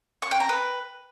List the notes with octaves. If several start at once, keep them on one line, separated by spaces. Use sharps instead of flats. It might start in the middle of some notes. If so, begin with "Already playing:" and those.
C#6
G5
A#5
B4